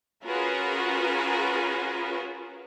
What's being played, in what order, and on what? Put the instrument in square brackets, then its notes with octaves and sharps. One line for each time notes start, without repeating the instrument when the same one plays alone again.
[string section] C#4 F4 F#4 G#4 A#4 B4